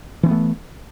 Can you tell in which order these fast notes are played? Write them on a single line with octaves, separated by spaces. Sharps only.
E3 C4 B3 A3